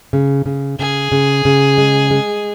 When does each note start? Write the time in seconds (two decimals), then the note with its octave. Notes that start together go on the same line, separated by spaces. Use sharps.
0.13 C#3
0.46 C#3
0.79 C#3 G#4
1.12 C#3
1.45 C#3
1.78 G#3
2.11 G#3